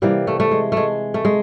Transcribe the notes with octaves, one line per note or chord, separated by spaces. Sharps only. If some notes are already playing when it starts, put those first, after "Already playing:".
C3 E3 G3 A#3
A3
A3
G#3
G#3 A3
A3
G#3